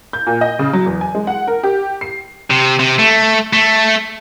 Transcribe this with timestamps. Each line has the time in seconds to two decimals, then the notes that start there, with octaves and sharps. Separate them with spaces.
0.13 G6
0.27 A#2
0.41 D#5
0.59 C#3
0.73 F#3
0.86 E2
1.01 G#5
1.15 G#3
1.27 F#5
1.47 A#4
1.63 G4
2.01 C7
2.51 C3
2.80 C3
2.99 A3
3.53 A3